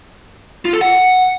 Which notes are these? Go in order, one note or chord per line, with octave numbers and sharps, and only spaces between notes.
F4
A4
F#5